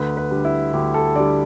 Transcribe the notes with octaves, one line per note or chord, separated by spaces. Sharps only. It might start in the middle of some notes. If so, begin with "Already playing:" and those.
Already playing: D2 B4
B4
D3 G3
E4
D2 G4
A4
D3 G3 D5